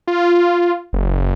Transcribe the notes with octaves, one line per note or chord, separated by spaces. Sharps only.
F4
F#1